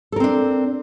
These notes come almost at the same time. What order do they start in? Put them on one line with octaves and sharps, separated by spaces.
A4 A#4 C4 D4